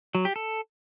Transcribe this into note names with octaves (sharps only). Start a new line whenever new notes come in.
F#3
G4
A4